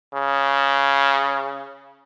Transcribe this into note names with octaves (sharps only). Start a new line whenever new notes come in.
C#3